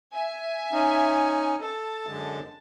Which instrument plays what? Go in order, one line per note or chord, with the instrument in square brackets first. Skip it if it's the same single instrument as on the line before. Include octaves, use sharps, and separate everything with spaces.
[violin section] E5 G#5
[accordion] C#4 D#4
[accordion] A4 [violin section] A5
[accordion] F#2 D3 G#3